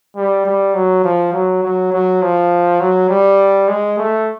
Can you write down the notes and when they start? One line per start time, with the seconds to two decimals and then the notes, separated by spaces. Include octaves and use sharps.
0.16 G3
0.46 G3
0.74 F#3
1.04 F3
1.33 F#3
1.63 F#3
1.92 F#3
2.22 F3
2.80 F#3
3.10 G3
3.68 G#3
3.98 A3